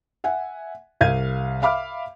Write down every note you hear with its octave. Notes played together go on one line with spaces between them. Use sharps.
E5 F#5 G#5
C2 F5 G#6 D#7
E5 F5 B5 D6 F6